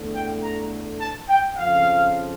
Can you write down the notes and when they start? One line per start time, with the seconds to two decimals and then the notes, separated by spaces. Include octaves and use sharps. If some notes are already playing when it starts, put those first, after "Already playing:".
Already playing: E2 D3 A3
0.13 G5
0.41 A#5
1.00 A5
1.28 G5
1.57 F2 C#3 F3 F5